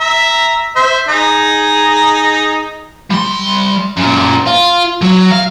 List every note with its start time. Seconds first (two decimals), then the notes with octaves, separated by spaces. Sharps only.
0.01 E5 A#5
0.76 C5 E5
1.08 D#4 G#4 A#5
3.11 G3 C6
3.97 F#2 A#2
4.47 F4
5.02 F#3
5.31 F5